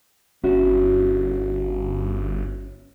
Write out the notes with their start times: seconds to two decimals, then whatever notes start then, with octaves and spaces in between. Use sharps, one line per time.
0.44 G1 C#4 E4 F#4